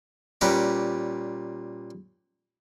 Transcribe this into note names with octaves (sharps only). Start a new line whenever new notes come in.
A#2 G3 C#4 B4 A#5 D6